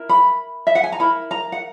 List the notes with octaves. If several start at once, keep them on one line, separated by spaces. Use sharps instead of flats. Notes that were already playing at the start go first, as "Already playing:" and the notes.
Already playing: E4 A#4
B5
E5
F#5
G#5
A#5
E4 A#4 B5
A#5
F#5